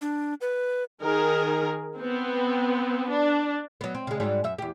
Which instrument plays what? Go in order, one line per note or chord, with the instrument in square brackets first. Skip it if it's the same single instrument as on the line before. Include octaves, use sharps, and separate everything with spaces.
[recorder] D4
B4
[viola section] D#3 G#4 A#4
B3 C4
D4
[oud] F#3 B3
C4
C#3 G#3
G#2 F#3 G3
F#2 E5
E2 G4